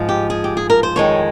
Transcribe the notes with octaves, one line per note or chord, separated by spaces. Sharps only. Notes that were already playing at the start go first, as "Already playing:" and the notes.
Already playing: G#2 F3 G#3
G4
G#4
G4
G#4
A#4
C5
F2 D#3 G#3 C#5